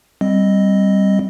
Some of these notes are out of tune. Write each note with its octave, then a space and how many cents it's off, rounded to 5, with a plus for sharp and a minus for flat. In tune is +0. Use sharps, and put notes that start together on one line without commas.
G3 +0 C4 +5 D#5 +0